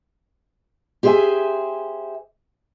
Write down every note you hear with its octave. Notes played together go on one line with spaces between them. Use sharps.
G4 G#4 C5 D#5 E5 G#5